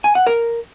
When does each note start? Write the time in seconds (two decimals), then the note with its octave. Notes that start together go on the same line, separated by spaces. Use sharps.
0.04 G#5
0.15 F#5
0.27 A#4